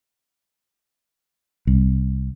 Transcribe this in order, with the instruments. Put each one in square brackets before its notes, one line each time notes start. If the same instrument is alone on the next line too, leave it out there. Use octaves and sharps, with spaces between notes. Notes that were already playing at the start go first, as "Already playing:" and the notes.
[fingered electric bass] C2